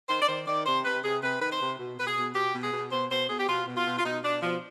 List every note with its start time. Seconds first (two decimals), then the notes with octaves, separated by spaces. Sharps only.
0.09 D#3 C5
0.21 D5
0.28 D#3 C5
0.47 D#3 D5
0.66 C3 C5
0.85 C3 B4
1.03 C3 G#4
1.22 C3 B4
1.40 D#3 B4
1.51 C5
1.60 C3
1.79 B2
1.98 B2 B4
2.07 G#4
2.17 B2
2.35 B2 G4
2.54 B2
2.63 G#4
2.72 B2
2.92 B2 C5
3.10 B2 C5
3.29 B2 G#4
3.39 G4
3.47 B2 F4
3.67 B2
3.77 F4
3.85 B2
3.98 F4
4.05 B2 D#4
4.23 B2 D4
4.42 B2 F3